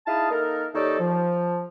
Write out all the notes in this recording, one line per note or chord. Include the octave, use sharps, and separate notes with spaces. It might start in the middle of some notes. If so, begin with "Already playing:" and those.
D#4 E4 G#4 F5 A5 D#6
A#3 D#4 A4 A#4
D#2 D#4 G4 A4 C#5 D5
F3